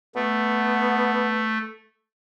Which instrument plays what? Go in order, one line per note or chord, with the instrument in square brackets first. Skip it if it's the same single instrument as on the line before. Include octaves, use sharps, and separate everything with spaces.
[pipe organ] A3 [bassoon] B3